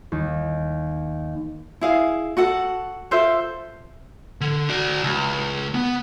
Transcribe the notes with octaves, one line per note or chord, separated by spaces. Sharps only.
D#2
E4 G#4 F5
F#4 A4 F#5
F4 A4 C5 E5
D3
F#4 D5
C#2
B3